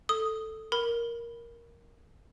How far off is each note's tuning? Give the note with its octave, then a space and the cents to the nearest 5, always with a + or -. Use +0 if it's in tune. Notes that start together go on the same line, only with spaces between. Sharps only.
A4 +0 D#6 +0
A#4 +5 B5 +0